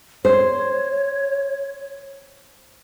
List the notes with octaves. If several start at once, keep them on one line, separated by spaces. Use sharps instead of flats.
C5 C#5